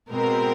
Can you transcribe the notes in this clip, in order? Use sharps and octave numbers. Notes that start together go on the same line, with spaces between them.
B2 G#3 C4 A#4